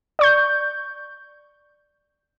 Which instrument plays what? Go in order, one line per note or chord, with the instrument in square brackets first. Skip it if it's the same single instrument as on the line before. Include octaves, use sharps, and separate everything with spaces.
[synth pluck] D5 C#6 G6